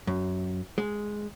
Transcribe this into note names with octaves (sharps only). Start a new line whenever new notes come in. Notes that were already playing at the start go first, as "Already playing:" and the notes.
F#2
G#3